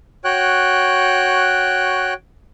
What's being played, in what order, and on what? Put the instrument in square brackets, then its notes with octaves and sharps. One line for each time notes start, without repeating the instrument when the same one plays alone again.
[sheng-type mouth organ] F#4 C#5 G5 F#6